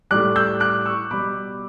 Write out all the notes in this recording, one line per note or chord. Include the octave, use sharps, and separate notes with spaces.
A2 G3 D6 F#6
E6 G6
D6 F#6
C#6 E6
B2 G3 B5 D6